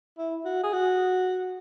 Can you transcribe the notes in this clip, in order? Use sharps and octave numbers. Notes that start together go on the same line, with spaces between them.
E4
F#4
G#4
F#4